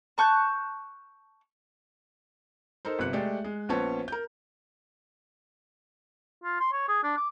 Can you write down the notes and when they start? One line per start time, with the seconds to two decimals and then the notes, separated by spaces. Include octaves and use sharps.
0.18 A5 C#6 F#6 G6
2.85 D#4 A4 A#4 C5
2.99 G1 C3 F#6 C#7
3.13 G#3 A3 G4 D5
3.44 G#3
3.69 A#1 B3 C#4 C5 C#5 A5
4.08 A#4 G6
6.44 F4
6.60 C6
6.72 C#5
6.88 G#4
7.03 D4
7.17 D6